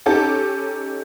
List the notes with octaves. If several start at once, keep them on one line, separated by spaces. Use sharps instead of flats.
C#4 D#4 G4 A4